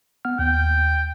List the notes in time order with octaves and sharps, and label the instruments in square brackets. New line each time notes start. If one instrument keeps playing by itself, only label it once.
[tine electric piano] B3 F#5 F6
[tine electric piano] D#2 [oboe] G5